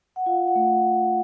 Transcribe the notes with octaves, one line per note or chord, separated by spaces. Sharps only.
F#5
F4 F5
F#5
A3